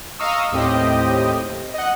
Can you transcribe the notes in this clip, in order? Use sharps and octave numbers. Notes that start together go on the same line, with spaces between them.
D#5 F5 A#5 C#6 D#6 E6
D#2 A2 C4 G4 D#5
D#5 F#5